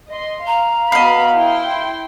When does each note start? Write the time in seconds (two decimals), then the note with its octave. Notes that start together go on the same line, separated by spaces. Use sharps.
0.10 D#5 C6
0.47 F5 A#5
0.92 B3 F#4 D#5 F5 B5
1.35 E4 G5 C6